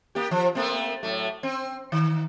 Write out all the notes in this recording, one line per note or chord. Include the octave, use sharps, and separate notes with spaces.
A#3 G4
F3
A3 A#3 C4
A2 F#3 A3
C4
D#3